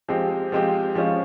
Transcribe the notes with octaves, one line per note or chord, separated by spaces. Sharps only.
F3 G#3 C4 G4
F3 G#3 C4 G4
F3 G#3 C#4 F4